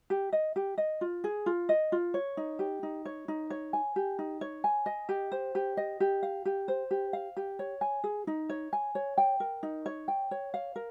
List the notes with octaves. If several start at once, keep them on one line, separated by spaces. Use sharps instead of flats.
G4
D#5
G4
D#5
F4
G#4
F4
D#5
F4
C#5
D#4
G4
D#4
C#5
D#4
C#5
G#5
G4
D#4
C#5
G#5
D#5
G4
C5
G4
D#5
G4
F5
G4
C5
G4
F5
G4
C#5
G#5
G#4
D#4
C#5
G#5
C#5
G5
A#4
D#4
C#5
G5
C#5
F5
A#4